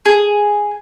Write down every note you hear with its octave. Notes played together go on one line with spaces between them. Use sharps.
G#4